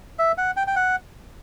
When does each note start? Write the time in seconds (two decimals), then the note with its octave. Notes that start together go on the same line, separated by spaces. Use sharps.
0.19 E5
0.38 F#5
0.57 G5
0.67 G5
0.76 F#5